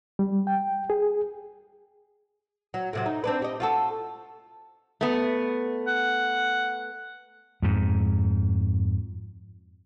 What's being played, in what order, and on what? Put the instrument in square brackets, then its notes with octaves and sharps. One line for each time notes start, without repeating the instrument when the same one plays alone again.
[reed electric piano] G3
G5
G#4
[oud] F#3
A2 C3 F#3
D#4
C4 D4 B4
G4 D#5
F4 F#4 A4
[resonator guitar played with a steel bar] A3 B3
[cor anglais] F#5
[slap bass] F2 G#2